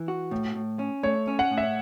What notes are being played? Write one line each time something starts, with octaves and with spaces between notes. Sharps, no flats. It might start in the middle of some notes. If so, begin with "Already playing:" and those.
Already playing: E3
F#4
A2
A2
C#4
A3 C#5
C#4
F#5
A2
E5